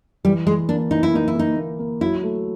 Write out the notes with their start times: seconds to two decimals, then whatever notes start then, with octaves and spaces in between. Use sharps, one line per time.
0.25 E3 G3
0.46 E3 G#3
0.69 A#3 D4
0.91 E3 D#4
1.03 E4
1.13 A#3 D#4
1.28 E4
1.35 A#3 D#4
1.57 A#3
1.79 A#3
2.01 F#3 E4
2.23 A3